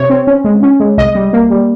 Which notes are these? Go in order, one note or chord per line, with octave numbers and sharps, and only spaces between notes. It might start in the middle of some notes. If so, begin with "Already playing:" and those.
Already playing: C3 C#5
C4
C#4
G#3
C#4
G#3
C2 D#5
G3
A#3
G3